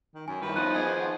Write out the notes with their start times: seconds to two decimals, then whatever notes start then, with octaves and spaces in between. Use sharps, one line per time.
0.15 D#3
0.28 F#2 G#5
0.41 G2 D#3 E4 B4
0.56 F3 B3 D#4 F#6 D#7
0.74 G#4 B4 D5 D#5 G#5 G#6
0.96 D#3 F#5